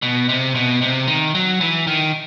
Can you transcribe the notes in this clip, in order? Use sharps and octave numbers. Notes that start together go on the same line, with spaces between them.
B2
C3
B2
C3
D#3
F#3
E3
D#3